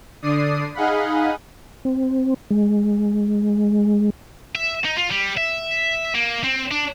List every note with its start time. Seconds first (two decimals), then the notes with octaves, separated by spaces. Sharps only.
0.22 D3 D5 D#6 C7 D#7
0.74 D#4 G#4 D#5 F5 F#5 B5
1.85 C4
2.51 G#3
4.55 E5
4.85 D#4
4.98 F4
5.11 G3
5.38 E5
6.15 A#3
6.43 C4
6.71 D4